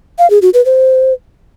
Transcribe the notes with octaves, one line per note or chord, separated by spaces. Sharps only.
F5
G#4
F#4
B4
C5